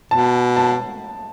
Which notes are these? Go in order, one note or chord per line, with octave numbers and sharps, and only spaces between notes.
B2 A5
A5